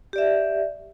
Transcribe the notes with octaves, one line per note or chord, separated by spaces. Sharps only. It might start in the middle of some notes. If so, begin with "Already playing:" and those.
G4 D5 E5